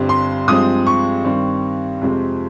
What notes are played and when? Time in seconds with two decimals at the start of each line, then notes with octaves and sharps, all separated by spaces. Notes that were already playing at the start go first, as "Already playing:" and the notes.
Already playing: G1 G2 G3 C4
0.09 C6
0.48 G2 F3 G#3 C4 D#6
0.87 C#6
1.25 G2 D#3 G3 C4
2.01 F2 C3 F3 G#3 C4